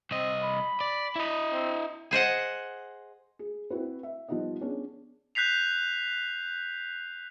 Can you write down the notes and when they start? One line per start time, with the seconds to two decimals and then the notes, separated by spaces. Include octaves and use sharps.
0.11 C2 C4 D#5
0.43 B5
0.81 D5
1.16 E4 D#5
1.52 C4
2.11 G#4 C5 D#5 F#5
3.39 G#4
3.70 C4 E4 F#4 B4
4.03 E5
4.29 F3 G3 B3 D#4 D#5
4.61 B3 C#4 D4 G#4
5.35 F#6 G6 B6 C7 F7